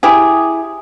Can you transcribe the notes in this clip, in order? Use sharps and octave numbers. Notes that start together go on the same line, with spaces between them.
E4 G4 G#4